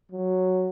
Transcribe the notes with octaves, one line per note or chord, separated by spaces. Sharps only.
F#3